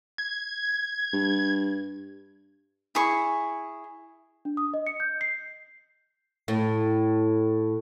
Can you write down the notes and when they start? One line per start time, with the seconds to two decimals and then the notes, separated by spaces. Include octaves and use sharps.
0.18 G#6
1.13 G2
2.95 E4 G#4 C#6
4.45 D4
4.57 D#6
4.74 D#5
4.87 C#7
5.00 G6
5.21 C7
6.48 A2